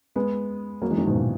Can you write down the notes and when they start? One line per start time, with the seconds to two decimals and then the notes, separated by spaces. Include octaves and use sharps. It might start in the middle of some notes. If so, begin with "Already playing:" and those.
0.16 G#3 B3
0.82 F#3 A#3
0.90 E3 G#3
0.98 D#3 F#3
1.07 G#2 B2
1.15 A#2